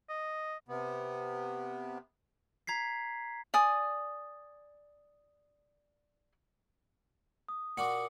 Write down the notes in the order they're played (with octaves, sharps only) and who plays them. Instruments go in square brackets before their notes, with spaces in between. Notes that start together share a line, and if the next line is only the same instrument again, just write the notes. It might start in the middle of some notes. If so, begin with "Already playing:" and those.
[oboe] D#5
[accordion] C3 B3
[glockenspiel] A#5 G#6 B6 C7
[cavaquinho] D5 G#5 D#6
[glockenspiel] D#6
[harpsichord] A#2 F#4 [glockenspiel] D6 C#7